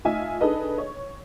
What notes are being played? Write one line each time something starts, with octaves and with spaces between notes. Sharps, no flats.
A3 D#4 F4 D#5 E5 G#5
D4 D#4 G#4 A4 B4 D#5
C#5